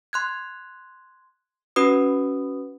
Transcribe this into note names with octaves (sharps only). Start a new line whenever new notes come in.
C6 F#6 G#6
C#4 F#4 B4 D#6